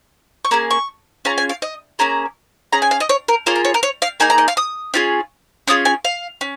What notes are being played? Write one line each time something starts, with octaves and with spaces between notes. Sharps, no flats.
C#6
A#3 C#4 G#4 A#5
C#6
C#4 F4 G#4 A#5
G#5
F5
D#5
A#3 C#4 G#4 A#5
C#4 G#4 A#5
G#5
F5
D#5
C#5
A#4
A#3 F4 G#4 C#5
A#4
C#5
A#4
C#5
F5
A#3 D#4 G#4 G#5
A#5
D#5
F5
D#6
C#4 F4 G#4
C#4 F4 G#4 D#6
G#5
F5
C#4